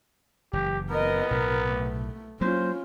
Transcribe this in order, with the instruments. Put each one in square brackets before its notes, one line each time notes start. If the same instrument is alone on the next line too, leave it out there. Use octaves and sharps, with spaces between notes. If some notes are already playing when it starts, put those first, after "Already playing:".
[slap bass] F#1 E3 [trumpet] G4
[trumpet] B3 [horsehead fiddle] A#4 D#5
[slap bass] B1 A2 C3 [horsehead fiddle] A#4
[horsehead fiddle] A3
[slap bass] F#3 A#3 [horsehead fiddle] C#4 F4 [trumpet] C5